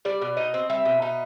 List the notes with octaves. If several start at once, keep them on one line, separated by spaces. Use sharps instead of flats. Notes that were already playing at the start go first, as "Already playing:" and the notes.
G3 D5
B2
D#4 D#5
C4
G3 E5
B2
D#4